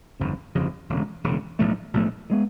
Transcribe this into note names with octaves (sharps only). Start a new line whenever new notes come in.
G1 F2 C#3 F3
G1 F2 C#3 F3
E1 D2 C#3
E1 D2 C#3
B1 A2 F3 A3
B1 A2 F3 A3
D#3 G#3 B3